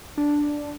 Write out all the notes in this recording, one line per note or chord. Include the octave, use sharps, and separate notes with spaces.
D4